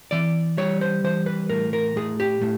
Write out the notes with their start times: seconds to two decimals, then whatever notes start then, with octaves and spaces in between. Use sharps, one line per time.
0.11 E3 D5
0.58 G3 C#5
0.81 C5
1.04 E3 C5
1.26 B4
1.50 A2 A#4
1.73 A#4
1.96 A2 G#4
2.20 G4
2.42 A2